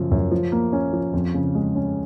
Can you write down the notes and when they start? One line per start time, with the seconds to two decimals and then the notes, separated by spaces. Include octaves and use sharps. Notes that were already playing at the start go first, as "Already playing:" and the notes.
Already playing: F#2 C#3 F3
0.11 F#2
0.31 F3
0.52 A#3
0.73 C#4
0.93 F3
1.13 F2
1.34 C#3
1.55 G#3
1.75 C#4